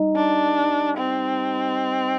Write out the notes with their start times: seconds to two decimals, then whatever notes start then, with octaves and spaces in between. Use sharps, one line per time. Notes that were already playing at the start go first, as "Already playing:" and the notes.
Already playing: G3 D#4
0.16 D4
0.97 C4